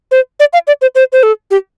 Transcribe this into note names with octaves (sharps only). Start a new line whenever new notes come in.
C5
D5
F5
D5
C5
C5
C5
A4
G4